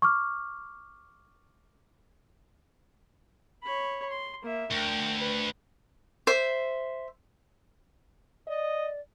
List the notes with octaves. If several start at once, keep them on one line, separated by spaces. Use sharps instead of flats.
C#6 D6 F6
C#5 B5
C6
A#3 E5
D2 A#4 G5
B4
C5 E5
D5 D#5